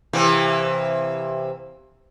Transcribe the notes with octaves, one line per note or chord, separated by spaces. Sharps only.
C3 E3 A#3